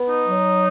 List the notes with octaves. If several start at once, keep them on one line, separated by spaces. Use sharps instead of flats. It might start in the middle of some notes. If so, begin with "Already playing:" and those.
Already playing: B3
D#4
F#3